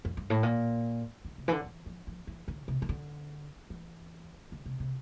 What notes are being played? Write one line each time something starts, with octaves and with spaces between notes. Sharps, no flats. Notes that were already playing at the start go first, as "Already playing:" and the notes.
F2
G2
A2
A#2
D3
C3
E3
D3
E3
F3
F3
E3
D3
C3
E3
D3
E3
D3
C3
C3